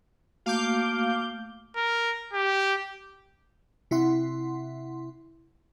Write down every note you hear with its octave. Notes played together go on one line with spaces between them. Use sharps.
A3 A#3 F#4 F5 D6 G6
A#4
G4
C3 E4 E5 F#5 C6